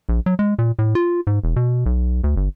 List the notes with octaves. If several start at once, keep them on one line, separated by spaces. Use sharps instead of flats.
A#1
F#3
G#3
A#2
A2
F4
G#2
E1
B2
B1
D2
G1